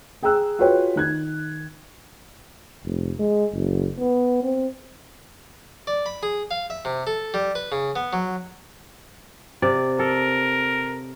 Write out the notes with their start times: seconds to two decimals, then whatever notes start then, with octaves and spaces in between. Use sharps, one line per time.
0.23 G#4 G5 A#5 E6 F#6
0.59 F4 F#4 G#4 B4 C#5 G5
0.96 D#3 F#6 G#6
2.84 F1
3.19 G#3
3.53 F#1
3.99 B3
4.43 C4
5.87 D5
6.06 B5
6.23 G#4
6.51 F5
6.70 E5
6.85 C3
7.07 A4
7.34 G3
7.55 B4
7.72 C#3
7.96 B3
8.13 F#3
9.62 C3 D5
9.99 A4 A#4